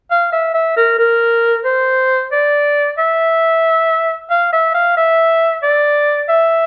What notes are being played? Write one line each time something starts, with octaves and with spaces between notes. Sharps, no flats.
F5
E5
E5
A#4
A#4
C5
D5
E5
F5
E5
F5
E5
D5
E5